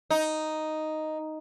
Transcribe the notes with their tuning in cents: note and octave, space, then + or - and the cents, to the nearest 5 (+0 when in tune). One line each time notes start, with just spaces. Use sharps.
D#4 +0